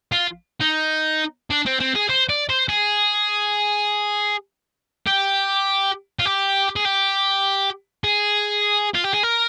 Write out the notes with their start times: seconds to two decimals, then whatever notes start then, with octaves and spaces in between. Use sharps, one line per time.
0.12 F4
0.61 D#4
1.50 D4
1.66 C4
1.80 C4
1.95 G#4
2.09 C5
2.29 D5
2.50 C5
2.69 G#4
5.07 G4
6.19 F4
6.26 G4
6.76 G#4
6.85 G4
8.04 G#4
8.94 F4
9.04 G4
9.14 G#4
9.23 A#4